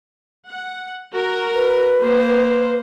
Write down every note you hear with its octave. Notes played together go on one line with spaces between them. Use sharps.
F#5
F#4 A#4 A#5
B4
A#3 C5